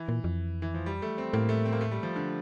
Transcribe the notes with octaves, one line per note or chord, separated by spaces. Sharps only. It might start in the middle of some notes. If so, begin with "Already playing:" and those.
Already playing: E3
A#2
F2
E3
F3
G3
A3
C4
A2 A#3
A3
C4
A#3
A3
G3
F3
D3